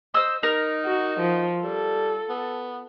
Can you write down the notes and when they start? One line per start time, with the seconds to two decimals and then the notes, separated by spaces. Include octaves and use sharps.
0.14 C5 D#5 E6
0.43 D#4 A#4
0.85 F#4
1.20 F3
1.64 G3 A4
2.30 B3